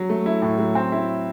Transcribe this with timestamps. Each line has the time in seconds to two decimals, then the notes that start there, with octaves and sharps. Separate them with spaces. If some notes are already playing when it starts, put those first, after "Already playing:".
Already playing: F#3
0.09 A3
0.26 E4
0.42 A2
0.59 F#3
0.75 C4
0.92 E4